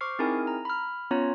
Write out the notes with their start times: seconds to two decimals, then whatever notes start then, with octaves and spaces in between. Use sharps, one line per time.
0.01 C5 C#6 D6 F6 C7
0.19 C4 D#4 E4 G#4 A#4 G#5
0.47 A#5
0.65 B5 F6
1.11 B3 C#4 F4 C#5 A#5